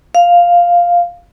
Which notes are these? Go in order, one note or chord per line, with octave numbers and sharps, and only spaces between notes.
F5